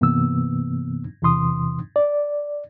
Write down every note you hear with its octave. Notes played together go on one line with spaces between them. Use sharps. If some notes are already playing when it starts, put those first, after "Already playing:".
G2 C3 E3 A#3 B3 E6
E2 C3 E3 C6 D#6
D5